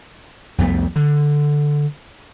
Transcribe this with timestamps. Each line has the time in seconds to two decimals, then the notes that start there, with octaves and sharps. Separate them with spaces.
0.58 C2 F2 A3 B3
0.96 D3